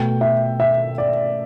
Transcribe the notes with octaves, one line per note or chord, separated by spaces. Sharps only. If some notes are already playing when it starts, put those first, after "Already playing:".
Already playing: B2 A3 G5
E5
E5
D5